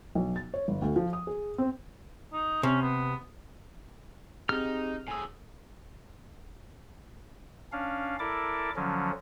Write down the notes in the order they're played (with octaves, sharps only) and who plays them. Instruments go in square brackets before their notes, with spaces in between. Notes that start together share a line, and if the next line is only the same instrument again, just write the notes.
[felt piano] B1
A6
C#5
G1
D2
F3
D#6
G#4
C4
[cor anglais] D#4
[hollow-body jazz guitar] C3 [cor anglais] C#4
[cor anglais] B3
[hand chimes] C4 G4 G#4 [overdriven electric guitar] D#4 [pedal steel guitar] F6
[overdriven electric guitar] A2 G#4 [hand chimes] G#5 E6
[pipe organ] C#4 D4 F5
E4 A4 A#4 D5 D6
D3 F3 F#3 C#4